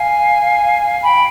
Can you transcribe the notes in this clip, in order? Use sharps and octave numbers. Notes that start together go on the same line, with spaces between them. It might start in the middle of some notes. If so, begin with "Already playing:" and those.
Already playing: F5 G#5
G5 B5